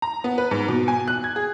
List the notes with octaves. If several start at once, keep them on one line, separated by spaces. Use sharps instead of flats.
A#5
B3
B4
G#2
B2
G#5
F#6
G#6
G#4